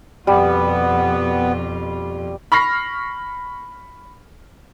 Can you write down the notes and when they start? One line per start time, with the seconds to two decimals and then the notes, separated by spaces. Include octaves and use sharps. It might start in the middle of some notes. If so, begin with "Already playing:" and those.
0.27 F2 B2 G3 B3 F4
2.52 B5 C#6 F6 A#6 C7